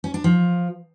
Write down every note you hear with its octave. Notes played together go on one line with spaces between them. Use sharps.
C#4
D4
F3